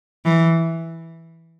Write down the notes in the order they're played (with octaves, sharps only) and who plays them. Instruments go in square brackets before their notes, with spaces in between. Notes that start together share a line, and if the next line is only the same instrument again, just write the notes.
[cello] E3